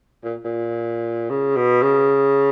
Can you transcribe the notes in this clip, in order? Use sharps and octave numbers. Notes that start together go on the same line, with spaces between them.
A#2
A#2
C#3
B2
C#3